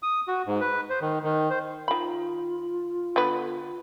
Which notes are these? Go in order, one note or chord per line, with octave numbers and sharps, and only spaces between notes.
D#6
F#4
G#2
B4
C5
D#3
D#3
C5
D#3 F4 B5
D3 B3 B4